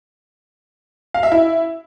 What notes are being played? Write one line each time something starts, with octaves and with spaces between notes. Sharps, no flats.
F5
E5
E4